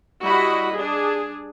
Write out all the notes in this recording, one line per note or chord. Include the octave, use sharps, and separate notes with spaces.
G3 E4 F#4 D#5 B5
D4 G#4